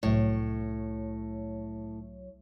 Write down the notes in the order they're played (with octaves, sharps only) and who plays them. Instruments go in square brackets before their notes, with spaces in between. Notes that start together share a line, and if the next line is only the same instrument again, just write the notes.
[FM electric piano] C2 F#3 C#5 [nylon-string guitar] A2